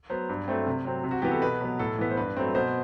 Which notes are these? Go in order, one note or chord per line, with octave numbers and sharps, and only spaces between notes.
F#3 B3 C5
G2
F#3 A3 C4
C3
F#3 C4
C3
F#4
E3 B3 G4
A4
B2 B4
F#3 B3
A2 A4
E3 B3
C5
G2 B4
F#3 A3 C4
B2 C5